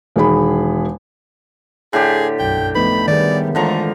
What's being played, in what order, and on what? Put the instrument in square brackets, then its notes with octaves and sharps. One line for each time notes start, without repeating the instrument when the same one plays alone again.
[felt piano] E1 D#3 G#4 B5
[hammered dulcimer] A2 D3 G4 [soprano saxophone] G#4
[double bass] B1 F#2 [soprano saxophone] G5
[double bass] F3 A3 [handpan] B3 D#4 B4 [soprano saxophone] B5
[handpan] D#3 G#4 [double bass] G3 B3 [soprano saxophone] D5
[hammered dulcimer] D3 F3 A#5 [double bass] E3 G#3 [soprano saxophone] A3